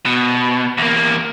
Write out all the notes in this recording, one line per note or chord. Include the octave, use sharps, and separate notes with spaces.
B2
E2 A#3